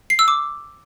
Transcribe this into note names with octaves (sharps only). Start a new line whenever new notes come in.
C7
E6
D6